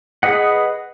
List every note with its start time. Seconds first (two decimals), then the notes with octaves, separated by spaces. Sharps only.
0.23 G#4 B4 D#5 F#5